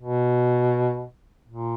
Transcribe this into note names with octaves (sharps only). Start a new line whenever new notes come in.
B2
A#2